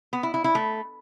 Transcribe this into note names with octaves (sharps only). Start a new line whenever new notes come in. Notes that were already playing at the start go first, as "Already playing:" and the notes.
B3
E4
E4
E4
A3